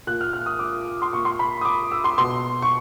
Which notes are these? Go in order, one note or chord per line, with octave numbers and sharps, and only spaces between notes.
A#2 F#6
F6
F6
D#6
D6
C6
A#2 C#6
C6
B5
D#6
D6
E6
C6
B2 C6
C#6